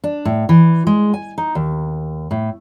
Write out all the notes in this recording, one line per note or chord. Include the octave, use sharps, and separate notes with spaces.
D4
A2
E3
G#3
G#5
D#4
D#2
A2